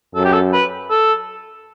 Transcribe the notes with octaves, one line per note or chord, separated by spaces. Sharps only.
F#2 A4
G4
A4
B4
A4